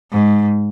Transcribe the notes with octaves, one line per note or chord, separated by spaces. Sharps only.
G#2